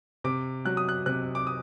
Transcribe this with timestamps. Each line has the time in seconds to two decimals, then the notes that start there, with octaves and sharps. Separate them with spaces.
0.24 C3 D6
0.65 F#3 F#6
0.77 D#6
0.89 F#6
1.06 C3 F#6
1.35 D6
1.47 D#6